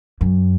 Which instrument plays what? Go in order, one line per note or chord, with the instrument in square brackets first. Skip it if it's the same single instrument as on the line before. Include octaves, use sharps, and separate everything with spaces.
[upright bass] F#2